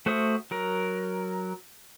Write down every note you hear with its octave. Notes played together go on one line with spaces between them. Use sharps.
A3 F#4 C5 E5 D#6
F#3 A#4